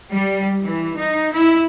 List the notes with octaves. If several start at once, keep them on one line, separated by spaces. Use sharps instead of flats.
G3
E3
D#4
E4